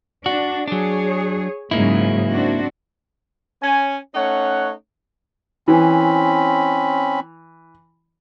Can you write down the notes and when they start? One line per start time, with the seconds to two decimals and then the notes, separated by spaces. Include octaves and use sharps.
0.26 D4 F#4
0.68 F#3 D4 G#4 C#5
1.71 G#2 C#3 F#3 A#3 D#4 E4
2.29 C4 D4 F#4
3.63 C#4 G#5
4.14 A3 C#4 D#4 C#5 F#5
5.68 E3 C4 C#4 B5